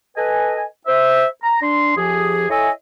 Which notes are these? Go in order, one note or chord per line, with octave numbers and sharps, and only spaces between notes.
A4 B4 D#5 G#5
C5 E5
A#5
D4 C6
F2 F3 G4 G#4
E4 A4 C#5 D#5 E5 G#5